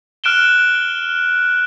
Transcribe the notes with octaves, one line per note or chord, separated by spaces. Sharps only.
F6 F#6 D7 E7 G7